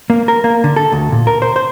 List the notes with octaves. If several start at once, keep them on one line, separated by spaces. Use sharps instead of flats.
A#3
A#4
A#3
D3
A4
D2
A#2
A#4
C5
C5